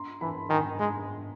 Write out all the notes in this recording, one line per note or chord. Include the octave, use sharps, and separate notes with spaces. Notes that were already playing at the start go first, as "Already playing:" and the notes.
Already playing: A#5 C6
E3 A5 B5
D#3 G#5 A#5
G#3